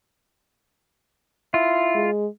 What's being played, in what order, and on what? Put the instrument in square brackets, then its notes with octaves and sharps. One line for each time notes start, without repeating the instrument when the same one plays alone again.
[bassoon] E4 [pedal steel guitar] F4
[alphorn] G#3